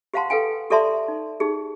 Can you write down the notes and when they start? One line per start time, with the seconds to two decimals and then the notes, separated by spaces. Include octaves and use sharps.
0.14 G4 C5 F5 F#5 A5 C6
0.30 A4 B4 F5 G5 G#5
0.70 G4 A4 D5 E5 A5 C6
1.08 D#4
1.40 D#4 G4 G#4